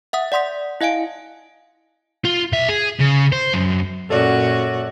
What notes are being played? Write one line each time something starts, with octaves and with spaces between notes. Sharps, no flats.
E5 F#5 D#6
D5 F#5 C6 D#6 B6
E4 D#5 F5 G#5 D7
F4
B1 E5
G#4
C#3
C5
F#2
F#2 A#2 F#4 A4 C#5 D5